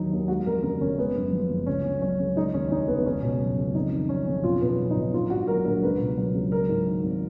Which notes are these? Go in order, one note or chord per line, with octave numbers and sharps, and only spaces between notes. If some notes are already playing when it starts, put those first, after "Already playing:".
Already playing: D#2 D#3 F#3 D#4
D#2
G#3 F#4
F2 A#4
C#3 A#4
F1 C#4
G#3 B3
F#2
F3
F#1
C#2 C#4
C#3
F#3 C#4
C#2
G#3 D#4
D#2 C#4
C#3 D#4
F1 B3
B3
C#2 C#4
B2
F#3
C#2
F2 D#4
D#3
F#3 C#4
F2
B1 F4
B2 B3
C#4
F#3
D#4
B1
A#1 F4
G#2 F#4
F#3 A#4
A#1 A#4
C#2 B4
B2
F#3
C#2
F#3 A#4
G#2
D#3
G#1